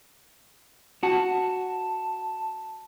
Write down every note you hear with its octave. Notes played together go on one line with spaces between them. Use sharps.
F#4 A5